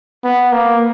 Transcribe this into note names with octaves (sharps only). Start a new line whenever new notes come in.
B3
A#3